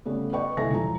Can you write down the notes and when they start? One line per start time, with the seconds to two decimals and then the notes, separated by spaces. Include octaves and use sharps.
0.05 C#3 G3 A3 B3
0.33 B4 D5 D#5 G5 C#6
0.57 C2 A4 E5 G#5 A5 A#6
0.70 E1 F3 A#5